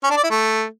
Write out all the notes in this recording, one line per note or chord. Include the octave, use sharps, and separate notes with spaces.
C#4
D4
D5
E4
A3